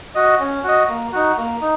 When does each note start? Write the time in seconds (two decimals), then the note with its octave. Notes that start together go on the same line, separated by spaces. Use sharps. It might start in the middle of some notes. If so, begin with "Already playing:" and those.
0.15 F#4 D#5
0.40 C#4
0.64 F#4 D#5
0.88 A#3
1.12 D#4 F#4
1.37 A#3
1.61 D#4